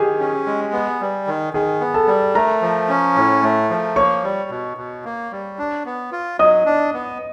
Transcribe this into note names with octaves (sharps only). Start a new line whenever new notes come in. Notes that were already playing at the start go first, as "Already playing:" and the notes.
Already playing: D#3 G4 G#4 G#5
C#4
G#3
B3
G3
D#3
D#3 G#4 G#5
B3
A4 A5
G3
A3 A#4 A#5
F3
C#4
A2
A3
F3
A#3 C#5 C#6
G3
B2
B2
A#3
G3
D4
B3
F4
F#3 D#5 D#6
D4
B3